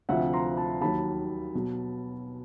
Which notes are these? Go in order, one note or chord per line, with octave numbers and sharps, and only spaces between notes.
D2 C3 F3 E5 F#5
A#5 C6
A5 B5
D#2 D#3 F#3 A5 B5
B2 F#3